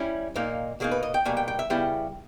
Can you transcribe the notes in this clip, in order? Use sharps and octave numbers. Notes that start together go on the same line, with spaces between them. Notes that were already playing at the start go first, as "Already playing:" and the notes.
Already playing: G3 C#4 E4
A#2 A#3 D#4
B2 A#3 D#4 G#4
B4
D#5
G5
B2 G3 A#3 G#5
G5
G5
E5
C#3 G3 B3 E4 G5